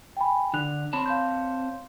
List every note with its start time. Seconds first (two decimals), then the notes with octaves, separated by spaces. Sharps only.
0.17 G5 G#5 B5
0.54 D3 D4 F#6 F7
0.93 C4 C#5 A5 B5 C6
1.06 F5 C6 G6